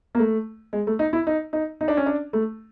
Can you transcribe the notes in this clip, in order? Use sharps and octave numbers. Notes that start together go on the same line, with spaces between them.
A#3
A3
G#3
A3
D#4
E4
D#4
D#4
D#4
D4
C#4
D4
A3